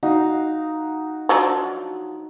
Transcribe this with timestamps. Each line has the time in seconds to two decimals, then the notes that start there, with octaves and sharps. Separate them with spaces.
0.03 D#4 F#4 F5
1.29 F3 F#3 D4